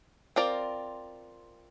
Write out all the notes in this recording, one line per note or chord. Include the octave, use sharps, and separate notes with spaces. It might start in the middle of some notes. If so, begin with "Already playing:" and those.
C4 F4 A#4 D5